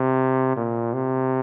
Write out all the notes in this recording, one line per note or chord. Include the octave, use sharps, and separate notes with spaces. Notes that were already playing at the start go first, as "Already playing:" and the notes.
Already playing: C3
A#2
C3